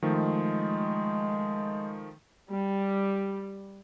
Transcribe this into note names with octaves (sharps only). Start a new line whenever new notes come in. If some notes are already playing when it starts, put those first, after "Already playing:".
D#3 F3 G#3 A3
G3